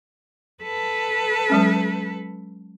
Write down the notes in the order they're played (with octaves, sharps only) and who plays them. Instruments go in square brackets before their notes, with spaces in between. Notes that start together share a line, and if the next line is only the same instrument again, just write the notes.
[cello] A4 B4
[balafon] F#3 G#3 C#4